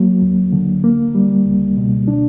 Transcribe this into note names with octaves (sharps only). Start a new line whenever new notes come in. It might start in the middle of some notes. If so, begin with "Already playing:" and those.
Already playing: F#3 A#3
D2
D3
A#3
G3
C#2
B2
D4